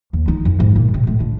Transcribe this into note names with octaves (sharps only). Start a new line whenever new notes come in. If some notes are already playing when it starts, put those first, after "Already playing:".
D#2
D#4
F2
G#2
A#2
C3
A2
D3